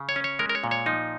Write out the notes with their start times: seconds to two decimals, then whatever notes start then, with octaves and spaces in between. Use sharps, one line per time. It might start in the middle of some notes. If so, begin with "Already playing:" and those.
Already playing: C#3
0.09 C#5
0.16 C#4
0.24 C#5
0.39 G#3 A#4
0.49 A#4
0.55 C#5
0.64 A#2
0.71 C#5
0.86 F3 D#4